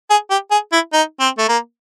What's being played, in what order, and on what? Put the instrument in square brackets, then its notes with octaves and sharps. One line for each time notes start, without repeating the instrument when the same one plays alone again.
[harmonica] G#4
G4
G#4
E4
D#4
C4
A3
A#3